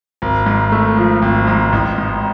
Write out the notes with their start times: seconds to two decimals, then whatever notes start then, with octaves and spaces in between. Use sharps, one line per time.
0.22 G#1
0.46 G#2
0.72 A3
0.97 F3
1.22 G#1
1.47 G#2
1.72 A1
1.98 G#2